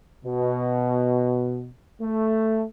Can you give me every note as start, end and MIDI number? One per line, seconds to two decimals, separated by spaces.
0.25 1.69 47
2.02 2.65 57